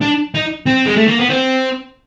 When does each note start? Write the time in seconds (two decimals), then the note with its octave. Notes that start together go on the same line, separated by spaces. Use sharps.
0.01 D4
0.35 D#4
0.66 C4
0.86 G#3
0.97 A3
1.08 A#3
1.19 B3
1.30 C4